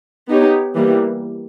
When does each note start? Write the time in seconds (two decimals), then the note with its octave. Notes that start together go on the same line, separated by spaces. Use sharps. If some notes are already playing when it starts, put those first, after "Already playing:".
0.29 B3 D#4 G4 C#5
0.75 E3 G3 A#3